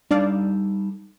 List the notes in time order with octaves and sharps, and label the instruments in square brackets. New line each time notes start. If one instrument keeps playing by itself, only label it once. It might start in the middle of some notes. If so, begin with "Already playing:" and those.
[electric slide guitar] G3 D#4 A4 [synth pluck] D4 D5 F5